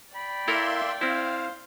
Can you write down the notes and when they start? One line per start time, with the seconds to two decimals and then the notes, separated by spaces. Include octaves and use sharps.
0.15 D5 G5 B5
0.48 A#3 E4 A4 A#4 E5 C6
1.01 C4 E4 C5 F5